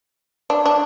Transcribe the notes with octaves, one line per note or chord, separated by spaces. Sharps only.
D4
D4